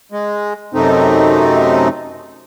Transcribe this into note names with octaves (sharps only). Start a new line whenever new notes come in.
G#3
F#2 C3 A3 C4 D#4